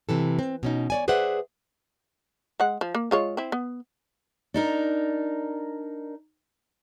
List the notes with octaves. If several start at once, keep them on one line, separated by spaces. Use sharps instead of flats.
C3 E3 A4
C4
B2 C#4 D#4
C#5 D5 G#5
G#4 B4 C5 D5 E5 F#5
G#3 F#5
F3
A#3
G#3 F4 C#5
C4 E4
B3
D4 D#4 A#4